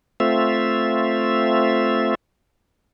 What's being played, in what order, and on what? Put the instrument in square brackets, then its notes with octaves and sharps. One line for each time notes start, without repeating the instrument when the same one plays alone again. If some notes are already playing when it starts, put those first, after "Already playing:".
[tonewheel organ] A3 C4 F4 E5